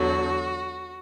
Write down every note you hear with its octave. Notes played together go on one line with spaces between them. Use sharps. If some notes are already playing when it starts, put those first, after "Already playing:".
Already playing: E2 D3 F#3 F#4